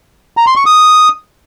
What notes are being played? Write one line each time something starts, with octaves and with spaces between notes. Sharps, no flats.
A#5
C6
C#6
D#6